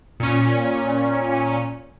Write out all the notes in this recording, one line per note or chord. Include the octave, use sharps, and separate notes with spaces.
A#2 C#4